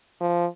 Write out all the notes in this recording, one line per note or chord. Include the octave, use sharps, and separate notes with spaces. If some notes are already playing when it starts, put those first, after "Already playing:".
F3